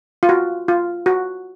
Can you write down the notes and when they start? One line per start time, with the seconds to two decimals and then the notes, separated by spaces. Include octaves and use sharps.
0.23 F4
0.29 F#4
0.68 F4
1.06 F#4